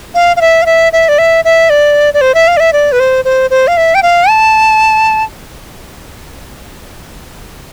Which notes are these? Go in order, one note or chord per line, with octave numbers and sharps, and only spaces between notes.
F5
F5
E5
F5
E5
E5
D5
E5
E5
D5
D5
C5
E5
F5
D5
E5
D5
B4
C5
C5
C5
F5
E5
G5
F5
A5